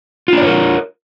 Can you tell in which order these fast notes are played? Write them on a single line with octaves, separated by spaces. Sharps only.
F4 D4 D5 C#5 A#4